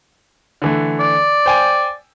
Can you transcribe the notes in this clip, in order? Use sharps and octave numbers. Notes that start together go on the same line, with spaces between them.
D3 E3 A3
D5
C5 G5 G#5